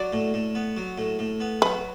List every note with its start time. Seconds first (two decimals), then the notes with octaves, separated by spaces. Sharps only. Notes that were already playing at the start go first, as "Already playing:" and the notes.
Already playing: F#3 D5
0.13 A2
0.34 A2
0.55 B3
0.77 F#3
0.98 A2
1.19 A2
1.40 B3
1.62 F#3 B4